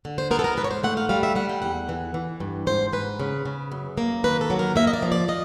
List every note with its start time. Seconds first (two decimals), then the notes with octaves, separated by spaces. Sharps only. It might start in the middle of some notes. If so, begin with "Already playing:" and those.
0.05 D3
0.18 C5
0.31 B3 A#4
0.39 A4
0.44 A#4
0.57 G#2 B4
0.64 C#5
0.71 C5
0.84 A3 F#5
0.97 F5
1.09 G3 F5
1.23 E5
1.36 G3 F#5
1.49 G5
1.62 E2 F#5
1.89 E3
2.14 E3
2.40 G2
2.67 G#2 C5
2.93 G#2 B4
3.20 C#3
3.45 C#3
3.72 F#2
3.98 A#3
4.24 D#3 B4
4.41 A4
4.50 F#3
4.59 A#4
4.76 A#3 E5
4.87 D#5
4.93 D5
5.03 F3
5.12 D5
5.28 F3 D#5